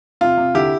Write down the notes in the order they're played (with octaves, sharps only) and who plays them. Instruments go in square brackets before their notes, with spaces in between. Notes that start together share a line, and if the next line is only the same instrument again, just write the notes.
[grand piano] C3 F4
C3
D3 E4 G4